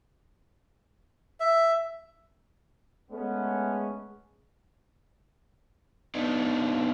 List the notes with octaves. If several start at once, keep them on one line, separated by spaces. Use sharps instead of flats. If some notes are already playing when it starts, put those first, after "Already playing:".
E5
G#3 A3 B3 C#4
B3 D4 D#4